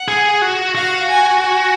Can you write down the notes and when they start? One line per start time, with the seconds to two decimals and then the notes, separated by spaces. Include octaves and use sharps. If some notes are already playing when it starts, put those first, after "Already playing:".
Already playing: F#5
0.08 G#4
0.42 F#4
0.75 F#4 F5
1.08 G#5
1.41 G#5